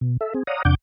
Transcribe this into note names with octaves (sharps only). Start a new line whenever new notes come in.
B2
A4 E5
C4 G#4
C#5 D5 F5 F#5 A#5 D#6
E2 C3 D4 F#5 D6 G6